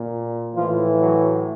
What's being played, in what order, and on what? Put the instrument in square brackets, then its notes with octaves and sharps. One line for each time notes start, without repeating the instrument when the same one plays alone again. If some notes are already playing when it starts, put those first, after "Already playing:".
Already playing: [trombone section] A#2
A2 E3 F3 F4
F#3 F#4